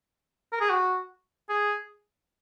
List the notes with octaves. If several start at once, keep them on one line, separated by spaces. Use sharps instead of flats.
A#4
G#4
F#4
G#4